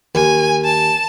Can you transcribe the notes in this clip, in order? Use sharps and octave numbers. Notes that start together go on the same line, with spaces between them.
D#2 G#5
A5